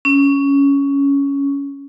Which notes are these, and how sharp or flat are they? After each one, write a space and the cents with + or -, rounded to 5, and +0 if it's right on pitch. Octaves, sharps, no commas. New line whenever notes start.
C#4 +10